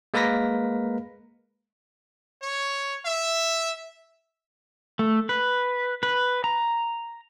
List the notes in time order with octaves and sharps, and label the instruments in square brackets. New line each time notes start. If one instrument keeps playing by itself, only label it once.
[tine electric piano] G#3 A#3 A#4 B4 A#6 B6
[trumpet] C#5
E5
[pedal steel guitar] A3
B4
B4
A#5